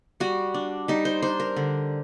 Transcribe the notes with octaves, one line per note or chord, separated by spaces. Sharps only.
G3 F#4
D4
G3 D#4
C5
D4 C5
A#4
D3